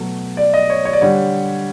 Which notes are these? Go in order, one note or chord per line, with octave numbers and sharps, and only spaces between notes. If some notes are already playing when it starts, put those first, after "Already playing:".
Already playing: B2 F#3 A3
D5
D#5
C#5
C#5
D5
D3 G3 C#5